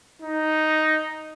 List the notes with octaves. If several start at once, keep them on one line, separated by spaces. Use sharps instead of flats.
D#4